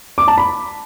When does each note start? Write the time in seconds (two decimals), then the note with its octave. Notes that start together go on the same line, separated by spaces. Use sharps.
0.18 D6
0.28 A5
0.38 B5